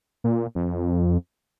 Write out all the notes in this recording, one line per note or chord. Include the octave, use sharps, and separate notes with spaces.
A#2
F2